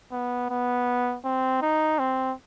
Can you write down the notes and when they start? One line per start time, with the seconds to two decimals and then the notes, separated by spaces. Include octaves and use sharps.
0.12 B3
0.50 B3
1.25 C4
1.62 D#4
1.99 C4